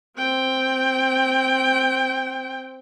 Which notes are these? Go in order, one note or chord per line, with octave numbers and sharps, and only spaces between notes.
C4 G5